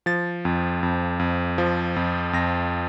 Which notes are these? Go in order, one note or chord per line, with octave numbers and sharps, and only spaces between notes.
F3 A6
F2
F2
F2
F3
F2
F2 A#6